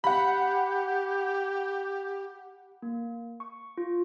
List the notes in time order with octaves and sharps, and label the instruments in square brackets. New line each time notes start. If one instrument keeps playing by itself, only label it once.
[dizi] G4 [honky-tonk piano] F#5 B5
[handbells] A#3
C#6
F4